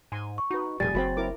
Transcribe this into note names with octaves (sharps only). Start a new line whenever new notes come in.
G#2 G#5 C6
C#6
D#4 F#4 B4
F1 A#2 G3 G#4 G#5 A6
F#1 F#3 G#3 C4 F#4 B5
E4 A#4 D6